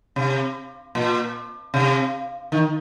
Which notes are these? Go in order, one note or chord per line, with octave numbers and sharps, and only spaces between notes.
C3
A#2
C3
D#3